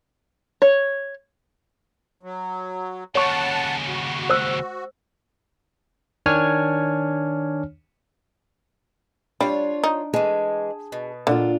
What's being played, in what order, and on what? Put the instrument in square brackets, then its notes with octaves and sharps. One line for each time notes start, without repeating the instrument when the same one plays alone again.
[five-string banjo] C#5
[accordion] F#3
[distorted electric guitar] D#2 C#3 [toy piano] C#5 C#6 [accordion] F#5 A5
[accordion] F#4
[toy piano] C5 E6
[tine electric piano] D#3 D4 C#5 G#5 F6
[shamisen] G3 [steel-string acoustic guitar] D4 [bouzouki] F4 C#5
[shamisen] D#4
[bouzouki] E3 G#3 [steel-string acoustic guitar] G#4 A5
[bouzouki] B2
[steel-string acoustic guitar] A#2 D4 F4 [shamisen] D3